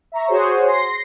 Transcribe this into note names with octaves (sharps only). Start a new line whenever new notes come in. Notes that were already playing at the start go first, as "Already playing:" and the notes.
E5 A#5 C#6
F#4 G#4 C5 C#5
C6 A#6 C7